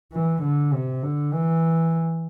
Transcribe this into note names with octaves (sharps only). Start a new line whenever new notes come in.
E3
D3
C3
D3
E3